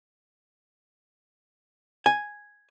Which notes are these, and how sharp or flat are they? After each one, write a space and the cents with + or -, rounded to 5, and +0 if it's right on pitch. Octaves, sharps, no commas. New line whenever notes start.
G#5 +0